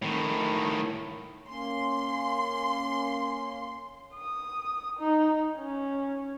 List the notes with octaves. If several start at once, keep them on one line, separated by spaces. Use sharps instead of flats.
A2 D#3
A#3 C#4 C6
D#6
D#4
C#4